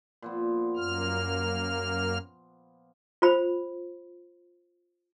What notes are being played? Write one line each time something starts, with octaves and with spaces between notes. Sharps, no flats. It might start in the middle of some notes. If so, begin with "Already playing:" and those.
A#2 F3 B3
F#2 A#3 F6
F4 C5 B5